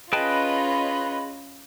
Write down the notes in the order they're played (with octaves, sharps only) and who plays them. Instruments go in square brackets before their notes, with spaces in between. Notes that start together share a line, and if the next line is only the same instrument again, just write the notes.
[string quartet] C#4 F4 [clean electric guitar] G#4 G5 A5 [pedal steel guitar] B4 [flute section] D#5 B5